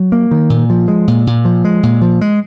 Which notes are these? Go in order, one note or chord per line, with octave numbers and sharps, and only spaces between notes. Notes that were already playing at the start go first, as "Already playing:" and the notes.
Already playing: F#3
A#3
D#3
A#2
F3
G#3
A#2
A#2
F3
G#3
A#2
F3
G#3